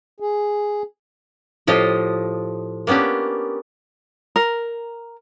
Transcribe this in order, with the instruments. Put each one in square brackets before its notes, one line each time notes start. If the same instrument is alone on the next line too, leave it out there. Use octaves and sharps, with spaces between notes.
[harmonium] G#4
[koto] A2 F3 F4 G4 D#5
A#3 B3 C#4 D4 G4
[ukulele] A#4